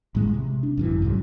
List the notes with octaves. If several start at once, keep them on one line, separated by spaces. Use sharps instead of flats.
A1 A2 G#3
C3
D4
G#1 F#2 E3
C2 G#2 C#3 F#3